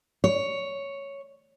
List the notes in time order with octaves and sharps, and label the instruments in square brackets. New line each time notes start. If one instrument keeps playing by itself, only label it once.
[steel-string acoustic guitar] C#5